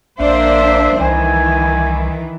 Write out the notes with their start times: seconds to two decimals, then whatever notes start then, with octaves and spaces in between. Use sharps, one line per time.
0.20 A#1 A#3 D4 C5 E5
1.00 C2 D#3 E3 G#5